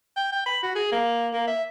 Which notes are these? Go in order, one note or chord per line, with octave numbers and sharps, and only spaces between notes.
G5
G5
B5
F#4
G#4
A#3
A#3
E5